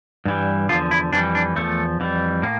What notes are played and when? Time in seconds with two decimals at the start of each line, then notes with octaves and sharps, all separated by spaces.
0.25 G2 E3 G3
0.69 E2 D3 F3 F4
0.91 E4
1.12 F2 E3 G3 D4
1.35 D4
1.56 E2 D3 F3 A3
2.00 F2 E3 G3
2.42 A2 A#3